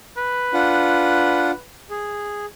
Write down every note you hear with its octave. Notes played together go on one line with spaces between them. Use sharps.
B4
D4 F4 F#5
G#4